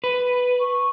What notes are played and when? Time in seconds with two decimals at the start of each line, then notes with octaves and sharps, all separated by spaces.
0.04 B4
0.60 C#6